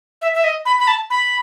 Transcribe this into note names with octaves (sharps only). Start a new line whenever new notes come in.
E5
E5
D#5
B5
B5
A5
B5